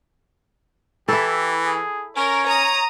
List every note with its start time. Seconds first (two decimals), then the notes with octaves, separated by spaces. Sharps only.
1.08 E3 E4 G4 A4
1.63 G#4
2.17 C#4 A#4 C#5
2.46 A#5 D#6